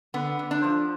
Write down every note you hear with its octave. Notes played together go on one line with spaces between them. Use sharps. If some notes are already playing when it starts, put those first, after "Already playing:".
D3 B3
D3
D4
F3